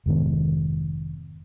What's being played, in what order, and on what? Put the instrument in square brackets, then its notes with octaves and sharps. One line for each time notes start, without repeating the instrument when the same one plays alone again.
[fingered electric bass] F1 G#2 D#3 B3